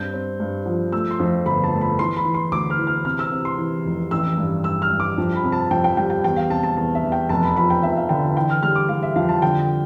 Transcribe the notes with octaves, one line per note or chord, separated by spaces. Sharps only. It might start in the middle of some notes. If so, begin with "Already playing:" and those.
Already playing: G2 C4 G6
C4
G2
F3
A3 E6
C6
F2
G1 B5
A5
A3
B5
E3 C6
B5
E3
C6
D2 D6
F6
E3
F6
C3 F6
E6
C3
C6
E3
F1
A1 E6
G2
G2 E6
F6
G2
D6
F2
B5
C3
A5
F2 G5
G5
G3 G5
G5
E2 G5
F5
C3 A5
A5
E2 A5
E5
E2
G5
F1 A5
B5
F3 B5
G5
F1 E5
F5
D3 G5
E3 G5
F6
G3 F6
D6
G3 F5
E5
F2 F5
A5
D3 G5